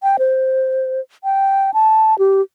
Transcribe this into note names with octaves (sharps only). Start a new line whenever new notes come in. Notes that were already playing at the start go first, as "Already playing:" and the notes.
G5
C5
G5
A5
G4